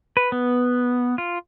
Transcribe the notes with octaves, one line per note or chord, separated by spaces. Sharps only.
B4
B3
F4